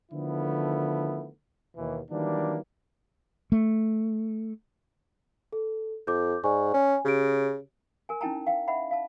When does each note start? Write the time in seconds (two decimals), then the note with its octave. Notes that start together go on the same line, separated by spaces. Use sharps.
0.12 D3 D#3 F3 A3 B3 E4
1.76 D#2 B2 E3
2.10 D#3 E3 F#3 G3 A#3 D4
3.52 A3
5.53 A4
6.07 F2 D6 G6
6.44 G#2 D5 G#5 C#6
6.74 C#4 G#5
7.05 C#3 G4 C#5 D7
8.09 A#4 G#5
8.21 C#4 D#4 E4 G5 A5 A#5
8.47 F5 G5
8.68 E5 F#5 B5
8.91 F5 A5